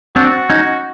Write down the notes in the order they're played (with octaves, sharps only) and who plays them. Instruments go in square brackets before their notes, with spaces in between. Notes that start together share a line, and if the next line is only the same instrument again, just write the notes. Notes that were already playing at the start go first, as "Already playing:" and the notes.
[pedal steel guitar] C4 D4 [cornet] F#4
[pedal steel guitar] C#4 D#4